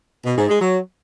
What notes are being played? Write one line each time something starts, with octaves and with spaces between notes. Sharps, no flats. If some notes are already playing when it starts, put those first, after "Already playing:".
B2
G#2
G#3
F#3